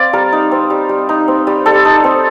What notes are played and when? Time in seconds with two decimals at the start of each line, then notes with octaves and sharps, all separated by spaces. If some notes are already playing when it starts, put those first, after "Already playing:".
Already playing: C4 D5 F5
0.13 G3 A#4
0.32 D#4
0.51 C4
0.70 G3
0.89 G3
1.09 D#4
1.28 C4
1.47 G3
1.66 G3 A4
1.85 D#4
2.04 C4